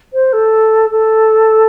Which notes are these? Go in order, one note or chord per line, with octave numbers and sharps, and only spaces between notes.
C5
A4
A4